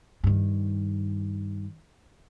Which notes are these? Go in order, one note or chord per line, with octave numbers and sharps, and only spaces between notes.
G2 D#3